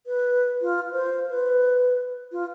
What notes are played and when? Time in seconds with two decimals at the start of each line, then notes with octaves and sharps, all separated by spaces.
0.06 B4
0.62 F4
0.92 C5
1.29 B4
2.32 F4